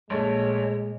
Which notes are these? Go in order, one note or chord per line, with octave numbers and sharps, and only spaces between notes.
A#1 A#2 G#3 A3 A4 C#5